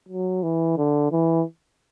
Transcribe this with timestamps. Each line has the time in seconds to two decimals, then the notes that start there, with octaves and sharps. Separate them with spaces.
0.08 F#3
0.43 E3
0.77 D3
1.12 E3